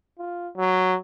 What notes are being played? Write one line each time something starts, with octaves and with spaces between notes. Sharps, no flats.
F4
F#3